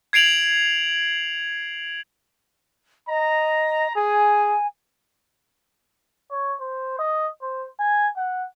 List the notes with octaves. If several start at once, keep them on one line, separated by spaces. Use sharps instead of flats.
G#6 C7 D7 F7 F#7
D#5 A#5
G#4 G#5
C#5
C5
D#5
C5
G#5
F#5